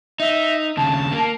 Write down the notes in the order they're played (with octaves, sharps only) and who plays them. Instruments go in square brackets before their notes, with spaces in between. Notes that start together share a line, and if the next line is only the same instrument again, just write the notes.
[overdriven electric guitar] D#4 [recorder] E5
[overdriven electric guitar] D#2 C#3 [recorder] A5
[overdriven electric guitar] A#3